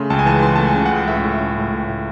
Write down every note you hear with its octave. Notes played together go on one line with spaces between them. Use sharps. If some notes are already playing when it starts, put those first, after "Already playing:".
Already playing: C#3 A3 C6
C#2 A5
G#5
E3 A5
E3 C6
A3 A5
G#5
C#3
F#5
C#2
A2 E5
A2
C#4
A2
A2
A2